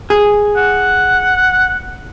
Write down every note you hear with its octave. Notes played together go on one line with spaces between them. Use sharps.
G#4
F#5